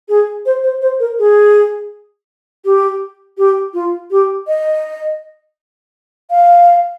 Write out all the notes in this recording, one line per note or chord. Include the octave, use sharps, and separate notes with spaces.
G#4
C5
C5
C5
A#4
G#4
G4
G4
F4
G4
D#5
F5